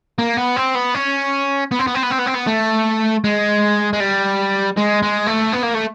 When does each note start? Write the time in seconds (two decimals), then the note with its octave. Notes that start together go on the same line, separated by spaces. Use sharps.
0.19 A#3
0.37 B3
0.56 C4
0.75 B3
0.95 C#4
1.71 B3
1.79 C4
1.87 B3
1.95 C4
2.03 B3
2.11 C4
2.19 B3
2.27 C4
2.35 B3
2.47 A3
3.24 G#3
3.93 G#3
4.00 G3
4.77 G#3
5.02 G#3
5.27 A3
5.53 B3
5.64 A#3
5.75 A3